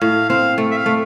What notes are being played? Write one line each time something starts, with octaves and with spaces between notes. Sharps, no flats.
A2 F5
C4 F5
A3
E5
F5
A3